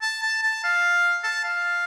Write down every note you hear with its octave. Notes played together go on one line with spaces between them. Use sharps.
A5
A5
A5
F5
A5
F5